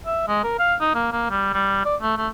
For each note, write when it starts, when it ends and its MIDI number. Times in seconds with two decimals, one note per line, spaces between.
0.06 0.26 76
0.28 0.42 56
0.44 0.55 70
0.59 0.75 77
0.80 0.93 63
0.95 1.11 58
1.12 1.30 58
1.30 1.49 55
1.54 1.81 55
1.85 1.96 74
2.01 2.14 57
2.17 2.28 57